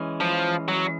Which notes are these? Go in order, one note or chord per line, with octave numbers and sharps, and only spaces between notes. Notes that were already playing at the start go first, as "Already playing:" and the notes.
Already playing: E3 G#3 C#4
F3
F#3